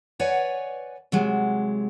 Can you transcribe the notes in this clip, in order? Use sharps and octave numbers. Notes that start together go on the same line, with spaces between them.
B4 C#5 D5 F#5 G#5
C3 F#3 G#3